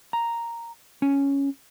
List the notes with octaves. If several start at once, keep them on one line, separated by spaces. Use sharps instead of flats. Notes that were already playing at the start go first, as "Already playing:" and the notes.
A#5
C#4